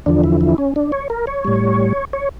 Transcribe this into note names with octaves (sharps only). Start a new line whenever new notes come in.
E2 D3 F3 D4
E4
E4
C#4
D4
C#5
A#4
C#5
A2 G3
C#5